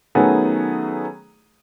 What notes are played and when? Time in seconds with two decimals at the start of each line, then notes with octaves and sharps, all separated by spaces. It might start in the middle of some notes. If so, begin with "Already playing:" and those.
0.15 D#3 F#3 A3 B3 C#4 G#4